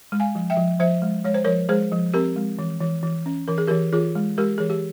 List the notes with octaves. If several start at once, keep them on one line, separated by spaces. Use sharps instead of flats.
G#3
F5 G#5
F3
E5 G5
F3
F3 C5 E5
G#3
G#3 C#5
C5
F3 A#4 C#5
G#3 G#4 C5
F3
C4 G4 A#4
G#3
E3
E3
E3
C#4
E3 A#4
G#4
E3 G4 A#4
E3 F4 G#4
G#3
G#3 G4 A#4
E3 G#4
G4